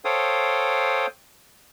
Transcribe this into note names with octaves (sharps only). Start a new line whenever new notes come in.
A4 C5 C#5 F5 G5 D#6